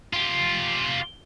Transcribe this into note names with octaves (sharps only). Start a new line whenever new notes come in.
F4 G4